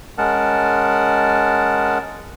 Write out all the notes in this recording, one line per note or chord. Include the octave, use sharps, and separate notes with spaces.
G#3 C#4 A#4 F#5 A5